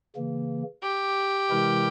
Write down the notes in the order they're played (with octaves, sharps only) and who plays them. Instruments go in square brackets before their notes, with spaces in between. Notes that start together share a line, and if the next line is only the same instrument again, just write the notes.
[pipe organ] C#3 E3 A#3
[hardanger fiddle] G4
[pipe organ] C3 E3 G#3 E4 A#4